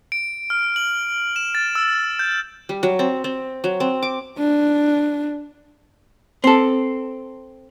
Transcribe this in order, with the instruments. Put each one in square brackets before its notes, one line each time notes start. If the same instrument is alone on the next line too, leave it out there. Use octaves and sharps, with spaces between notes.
[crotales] D7
F6
F#7
E7
A6
E6
G6
[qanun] G3
F#3
C4
C4
F#3
C4
D6
[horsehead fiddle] D4
[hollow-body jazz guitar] C4 A4